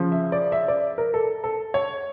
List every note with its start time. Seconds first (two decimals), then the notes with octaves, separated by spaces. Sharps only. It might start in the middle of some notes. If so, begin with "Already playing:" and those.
Already playing: C#3 F3
0.12 E5
0.32 D5
0.52 E5
0.68 D5
0.98 A#4
1.14 A4
1.44 A4
1.74 C#5